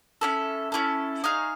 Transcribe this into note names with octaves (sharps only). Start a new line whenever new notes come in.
C#4 E4 A4
C#4 E4 A4
D#4 G#4 C#5 F5